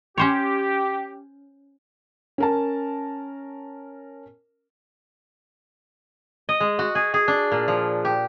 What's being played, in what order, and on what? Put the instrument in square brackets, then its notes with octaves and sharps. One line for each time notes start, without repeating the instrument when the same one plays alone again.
[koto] C#4 C5 C#5 [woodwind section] G4
[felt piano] C#4 A#4 A5
[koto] D#5
G#3
F#4
G#4
G#4
D4
A#2
F3
G4